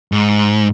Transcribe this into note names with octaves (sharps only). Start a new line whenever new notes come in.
G#2